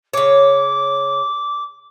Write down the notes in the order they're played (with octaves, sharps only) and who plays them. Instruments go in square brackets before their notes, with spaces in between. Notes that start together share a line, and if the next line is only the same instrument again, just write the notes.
[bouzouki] C#3 C#5 [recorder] D6